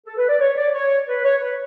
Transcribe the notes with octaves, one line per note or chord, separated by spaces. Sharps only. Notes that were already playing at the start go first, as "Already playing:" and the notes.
A4
B4
D5
C#5
D5
C#5
B4
C#5
B4